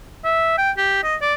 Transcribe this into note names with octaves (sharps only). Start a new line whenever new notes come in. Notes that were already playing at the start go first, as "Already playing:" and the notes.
E5
G5
G4
D#5
D5